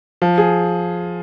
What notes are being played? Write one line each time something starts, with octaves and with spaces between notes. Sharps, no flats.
F3
G#4